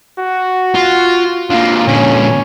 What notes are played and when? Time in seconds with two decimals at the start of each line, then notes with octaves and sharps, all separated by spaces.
0.19 F#4
0.75 F4
1.50 D3 A#3 F4
1.87 A#2 D3 C#4